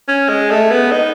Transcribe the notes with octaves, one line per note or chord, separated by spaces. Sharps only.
C#4
G#3
A3
B3
D#4